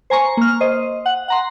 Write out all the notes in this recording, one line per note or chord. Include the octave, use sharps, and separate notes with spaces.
C5 G#5 A#5 C#6
A#3 F6
C5 D#5
F#5
F#5 A#5 C6